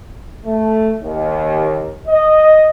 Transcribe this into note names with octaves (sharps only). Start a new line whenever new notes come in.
A3
D#2
D#5